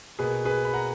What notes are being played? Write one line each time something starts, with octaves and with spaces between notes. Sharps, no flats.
B2 A#3 G#4 B4
G#4 B4
B5
F#5 A#5